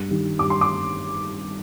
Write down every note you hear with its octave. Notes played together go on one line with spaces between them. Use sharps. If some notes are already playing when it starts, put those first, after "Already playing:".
Already playing: G2
D#3 G3
G2 D6
C6
D6